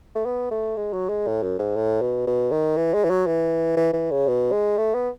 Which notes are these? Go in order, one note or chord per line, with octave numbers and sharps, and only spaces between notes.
A3
B3
A3
G#3
F#3
G#3
A2
F#2
G#2
A2
B2
B2
D#3
E3
G#3
E3
F#3
E3
E3
E3
C#3
B2
G#3
A3
B3